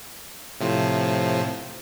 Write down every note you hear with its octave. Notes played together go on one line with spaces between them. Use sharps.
A2 C3 F3